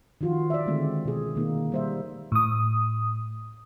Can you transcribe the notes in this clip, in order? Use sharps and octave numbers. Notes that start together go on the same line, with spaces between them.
D#3 F3 F4 F#4
D5 E5
D3 D#3 G#3 A3 C4
B2 G#4
D#3 A#3 D#4
G3 C5 E5
A2 D#6